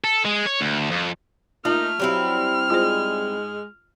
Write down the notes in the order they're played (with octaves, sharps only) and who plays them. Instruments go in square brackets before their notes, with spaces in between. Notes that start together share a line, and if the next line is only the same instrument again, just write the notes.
[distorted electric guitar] A4
G#3
C#5
D2
F2
[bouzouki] A3 [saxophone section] A#3 D#4 [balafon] F4 [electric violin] F6
[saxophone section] F#3 [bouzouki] G3 C4 E4
[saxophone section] G#2 G#3 [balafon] F4 C5